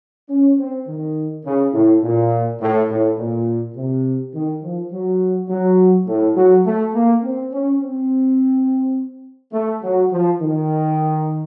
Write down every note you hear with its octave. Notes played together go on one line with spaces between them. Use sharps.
C#4
C4
D#3
C#3
A2
A#2
A2
A2
A#2
C3
D#3
F3
F#3
F#3
A2
F#3
A3
A#3
C4
C#4
C4
A3
F#3
F3
D#3